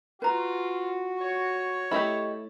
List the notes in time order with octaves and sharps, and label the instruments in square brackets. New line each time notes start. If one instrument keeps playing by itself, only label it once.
[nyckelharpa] F4 [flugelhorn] F#4 [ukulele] B4 A#5
[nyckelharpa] C#5
[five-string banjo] A3 E4 [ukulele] G4 D#5 B5